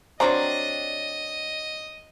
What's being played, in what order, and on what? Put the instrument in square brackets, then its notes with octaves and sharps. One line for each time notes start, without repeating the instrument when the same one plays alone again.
[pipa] F#3 G3 D4 [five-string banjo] C4 A#5 [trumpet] D#5